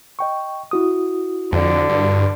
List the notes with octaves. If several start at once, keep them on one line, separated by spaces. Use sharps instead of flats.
D#5 G5 C#6
E4 F#4 D#6
F2 D3
G2